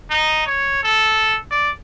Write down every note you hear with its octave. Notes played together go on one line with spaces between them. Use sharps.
D#4
C#5
A4
D5